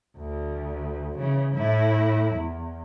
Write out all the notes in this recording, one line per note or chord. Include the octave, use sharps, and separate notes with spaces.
D2
C#3 E3
A2 E4
E2